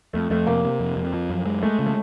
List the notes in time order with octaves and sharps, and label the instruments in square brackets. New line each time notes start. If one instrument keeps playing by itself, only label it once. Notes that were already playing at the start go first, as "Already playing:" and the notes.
[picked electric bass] F2 [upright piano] A3
[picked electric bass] F2 [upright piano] A3
[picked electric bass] C3 [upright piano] A#3
[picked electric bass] C3
F2
F2
F3
F#2
G#3
[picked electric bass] G#3 [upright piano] A3
[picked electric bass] C#3
[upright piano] A3